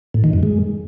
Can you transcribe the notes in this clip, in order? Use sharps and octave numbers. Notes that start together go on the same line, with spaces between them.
A2
D#3
F#2
G#3